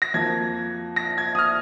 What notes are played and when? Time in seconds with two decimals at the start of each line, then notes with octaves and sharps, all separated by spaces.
0.02 A#6
0.14 F2 F3 A#3 G#6
0.96 A#6
1.18 G#6
1.35 D#6
1.39 F6